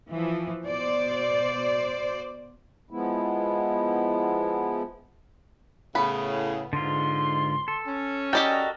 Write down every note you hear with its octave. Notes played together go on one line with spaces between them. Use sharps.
E3 F3
B2 C5 D5
F3 G#3 B3 E4
A2 C#3 B3 B5
G#2 D3 F4 C6
A4
C#4
F#4 G4 A4 A#4 D5 D#5 G5